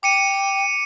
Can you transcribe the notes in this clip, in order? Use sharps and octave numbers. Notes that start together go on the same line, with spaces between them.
G5 D6 C#7 D#7